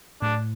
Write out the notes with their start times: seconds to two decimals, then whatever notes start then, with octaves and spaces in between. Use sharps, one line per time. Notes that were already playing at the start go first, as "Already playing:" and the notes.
0.22 A2 D4